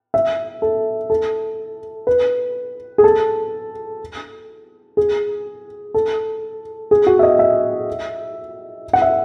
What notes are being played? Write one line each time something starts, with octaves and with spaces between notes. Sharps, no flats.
E5
A4
A4
B4
G#4
A4
G#4
A4
G#4
F#4
E5
D#5
E5
F#5
E5